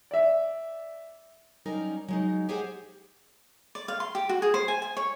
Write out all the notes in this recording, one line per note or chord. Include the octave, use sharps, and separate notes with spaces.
D5 E5
F#3 G3 C#4 D#4 A#4
F#3 G#3 D#4
G4 G#4 C5 D#5 F#5 G#5
D5
F5
C6
G4
F#4
G#4
C5
G#5
G#5
C#5